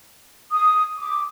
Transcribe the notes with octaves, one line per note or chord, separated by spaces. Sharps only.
D#6
D6